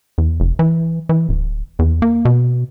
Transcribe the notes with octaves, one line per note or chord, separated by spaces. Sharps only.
E2
F1
E3
E3
D1
E2
A#3
B2